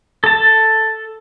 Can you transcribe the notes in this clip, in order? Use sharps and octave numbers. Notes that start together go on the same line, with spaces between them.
A4 A5